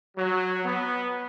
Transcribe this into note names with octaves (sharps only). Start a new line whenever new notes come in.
F#3
B3